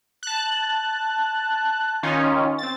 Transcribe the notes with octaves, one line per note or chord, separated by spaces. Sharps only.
A5 F#6
D#3 C#4 D#4 F4 C#5
C4 A6